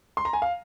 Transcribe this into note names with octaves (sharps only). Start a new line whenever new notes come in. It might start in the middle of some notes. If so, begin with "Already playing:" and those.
C6
A#5
G#5
F5